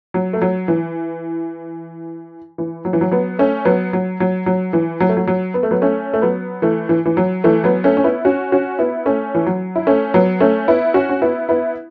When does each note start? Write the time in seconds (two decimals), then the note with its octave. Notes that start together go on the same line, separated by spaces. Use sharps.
0.14 F#3
0.33 A3
0.42 F#3
0.68 E3
2.58 E3
2.85 F#3
2.93 E3
3.01 F#3
3.11 F#3 B3
3.39 A3 C#4
3.65 F#3 B3
3.93 F#3
4.20 F#3
4.46 F#3
4.73 E3
5.00 F#3
5.09 A3
5.17 F#3
5.27 F#3
5.54 B3
5.63 A3
5.71 F#3 B3
5.82 A3 C#4
6.13 A3
6.22 F#3 B3
6.62 E3 A3
6.89 E3
7.06 E3
7.17 F#3
7.44 E3 A3
7.64 F#3 B3
7.84 A3 C#4
7.97 C#4
8.04 B3 E4
8.25 C#4 F#4
8.52 C#4 F#4
8.79 B3 E4
9.06 A3 C#4
9.35 E3
9.46 F#3
9.76 E4
9.87 A3 C#4
10.14 F#3 B3
10.40 A3 C#4
10.68 B3 E4
10.94 C#4 F#4
11.09 C#4
11.22 B3 E4
11.49 B3 E4